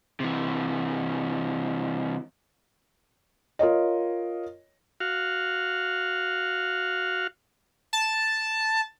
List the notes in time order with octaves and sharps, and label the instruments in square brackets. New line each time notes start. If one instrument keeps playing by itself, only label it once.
[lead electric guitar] C3 E3
[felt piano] F4 A#4 C#5 D#5
[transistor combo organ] F#4 F5
[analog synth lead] A5